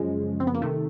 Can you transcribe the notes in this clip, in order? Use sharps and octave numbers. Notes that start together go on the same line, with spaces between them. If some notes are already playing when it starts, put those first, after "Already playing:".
Already playing: F#2 C#3 F3 G#3
C4
B3
A#3
C3 D#3 A3